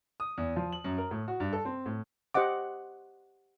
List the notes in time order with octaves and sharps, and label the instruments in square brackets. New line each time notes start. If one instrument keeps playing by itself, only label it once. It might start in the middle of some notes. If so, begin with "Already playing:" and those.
[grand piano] D#6
E2
F3
F#7
F#2
A#4
A2
F#4
G2
A4
C4
A2
[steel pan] G4 C5 D#5 F#5 D6